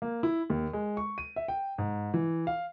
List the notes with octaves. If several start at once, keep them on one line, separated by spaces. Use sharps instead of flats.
A#3
E4
D#2
G#3
C#6
D#7
E5
G5
G#2
E3
F5